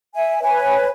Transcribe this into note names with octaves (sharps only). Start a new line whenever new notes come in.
E5 G#5
B4 C#5 G#5